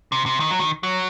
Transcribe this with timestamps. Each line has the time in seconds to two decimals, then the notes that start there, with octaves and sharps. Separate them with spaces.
0.12 C3
0.26 C3
0.40 D#3
0.51 F#3
0.59 D#3
0.83 F#3